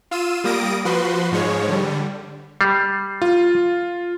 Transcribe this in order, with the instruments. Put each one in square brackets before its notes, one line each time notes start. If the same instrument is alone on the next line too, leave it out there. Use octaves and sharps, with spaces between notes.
[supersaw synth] F4 E6 D#7
G3 A#3 D#6 A#6 D7
F3 F#4 B4 C6
G#2 F3 G#3 C#5
D3 G3
[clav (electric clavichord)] G3 [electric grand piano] C7
[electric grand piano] F4